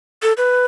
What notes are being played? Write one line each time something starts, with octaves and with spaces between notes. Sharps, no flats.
A4
B4